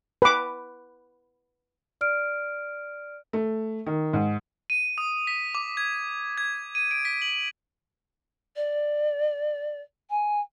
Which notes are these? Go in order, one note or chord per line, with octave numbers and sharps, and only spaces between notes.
B4 D6
D5 F6 D7
A3
D#3
G#2
D#7
D#6
B6
D6
G#6
G#6
D#7
D7
B6
F#7
D5
G#5